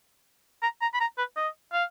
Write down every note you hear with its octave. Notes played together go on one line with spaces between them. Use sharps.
A#5
A#5
B5
A#5
B4
D#5
F5